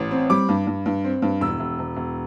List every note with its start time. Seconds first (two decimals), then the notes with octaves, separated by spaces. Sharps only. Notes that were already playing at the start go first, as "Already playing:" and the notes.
Already playing: A1
0.11 C4
0.30 G3 D6
0.49 G2
0.67 G2
0.86 G2
1.04 C4
1.22 G2
1.41 E1 E6
1.60 E1
1.79 E1
1.97 E1